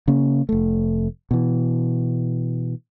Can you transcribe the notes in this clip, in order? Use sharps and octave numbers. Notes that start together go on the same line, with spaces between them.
C#3 A#3 C#4
F1 A3
B2 E3